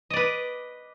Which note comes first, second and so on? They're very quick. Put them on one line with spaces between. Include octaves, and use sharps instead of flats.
D#5 D5 B4